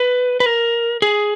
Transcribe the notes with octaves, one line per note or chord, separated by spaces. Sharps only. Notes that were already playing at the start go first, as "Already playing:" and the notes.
Already playing: B4
B4
A#4
G#4